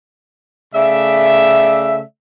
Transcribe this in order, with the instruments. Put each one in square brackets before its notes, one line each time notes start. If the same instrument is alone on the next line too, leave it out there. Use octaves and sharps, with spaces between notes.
[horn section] C#3 A3 D5 E5